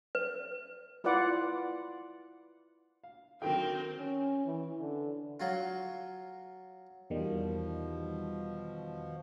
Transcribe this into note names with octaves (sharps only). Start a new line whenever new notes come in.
B4
E4 F4 B4 D5 F#5 D6
F5
D3 D#3 F#3 C4 A#4 G5
C#4
E3
D3
F#3 F4
E2 B2 D#3 F3 G3